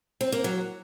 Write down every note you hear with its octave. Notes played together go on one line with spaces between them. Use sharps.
C4
A#3
F#3